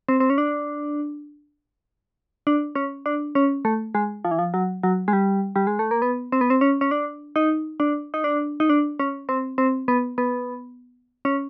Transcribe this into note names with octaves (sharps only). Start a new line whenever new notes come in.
C4
C4
C#4
D4
D4
C#4
D4
C#4
A3
G#3
F3
E3
F3
F#3
F#3
G#3
G3
G3
G#3
A3
A#3
B3
C4
B3
C4
C#4
C#4
D4
D#4
D4
D#4
D4
D#4
D4
C#4
C4
C4
B3
B3
C#4